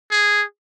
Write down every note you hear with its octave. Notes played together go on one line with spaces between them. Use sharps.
G#4